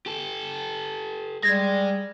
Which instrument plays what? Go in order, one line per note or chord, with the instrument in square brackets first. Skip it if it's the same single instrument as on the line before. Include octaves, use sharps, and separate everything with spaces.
[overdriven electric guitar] G4 A4
[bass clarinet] G3 [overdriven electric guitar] G#3 [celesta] G#6 A#6